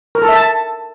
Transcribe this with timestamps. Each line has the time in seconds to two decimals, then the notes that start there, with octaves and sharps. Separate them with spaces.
0.15 A#4
0.22 A4
0.29 E5
0.35 A5